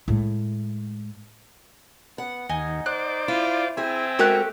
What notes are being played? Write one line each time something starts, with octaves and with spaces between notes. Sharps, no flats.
A2 G#3
B3 F#5
D#2 D#4 D#5 G#5
C5 D5 D6 F#6
E4 F4
C4 E4 G#4 E5 G#5
G#3 A3 F#4 G4 A#4 F#6